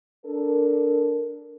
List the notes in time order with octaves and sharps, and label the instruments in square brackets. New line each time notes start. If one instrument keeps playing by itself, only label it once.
[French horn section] D4 A4 A#4